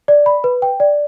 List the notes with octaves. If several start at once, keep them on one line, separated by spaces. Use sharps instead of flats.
D5
B5
B4
G5
D5